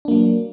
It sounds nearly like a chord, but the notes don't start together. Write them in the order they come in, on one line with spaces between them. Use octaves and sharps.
D4 A#3 F#3